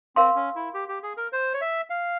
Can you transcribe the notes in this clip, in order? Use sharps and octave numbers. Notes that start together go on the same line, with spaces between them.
C4 A#4 F5 C6
C#4
E4
G4
G4
G#4
A#4
C5
C#5
E5
F5